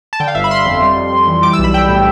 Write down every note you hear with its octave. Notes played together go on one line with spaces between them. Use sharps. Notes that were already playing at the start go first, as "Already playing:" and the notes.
A5
D3 G5
F5
G1 E5
B5
G1 C6
F2
G3
F2
F2
E3
G3 D6
E6
B1
B5
B1 G5
A2